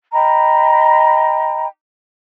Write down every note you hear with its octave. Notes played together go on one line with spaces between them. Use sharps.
D#5 G5 A#5 B5